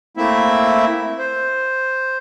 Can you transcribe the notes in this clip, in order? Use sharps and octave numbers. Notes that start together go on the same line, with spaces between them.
A3 A#3 C4 E4 E5
C5